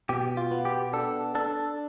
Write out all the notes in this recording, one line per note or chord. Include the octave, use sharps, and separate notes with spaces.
B2 G4
F4
B3
G4
D4 A4
D4 A4